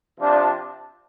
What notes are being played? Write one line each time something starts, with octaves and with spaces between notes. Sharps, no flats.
C3 F3 D4